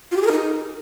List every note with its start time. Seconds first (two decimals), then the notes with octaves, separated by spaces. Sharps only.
0.11 F4
0.16 G4
0.21 G#4
0.26 A#4
0.31 D#4